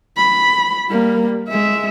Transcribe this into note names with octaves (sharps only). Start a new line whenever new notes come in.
B5
G3 A#3
G#3 E5